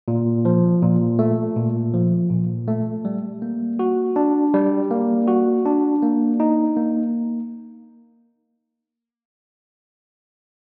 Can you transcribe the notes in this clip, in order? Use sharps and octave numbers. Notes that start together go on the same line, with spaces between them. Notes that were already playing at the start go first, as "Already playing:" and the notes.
A#2
F3
A#2
A3
A#2
F3
A#2
A3
G3
A#3
F#4
D4
G3
A#3
F#4
D4
A#3
D#4
A#3